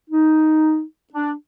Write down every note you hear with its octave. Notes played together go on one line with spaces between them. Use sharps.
D#4
D4